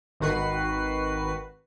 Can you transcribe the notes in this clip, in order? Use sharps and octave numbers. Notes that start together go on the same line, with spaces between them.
G#1 D#3 F#4 B4 C7